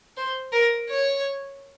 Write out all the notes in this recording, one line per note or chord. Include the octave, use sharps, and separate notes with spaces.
C5
A#4
C#5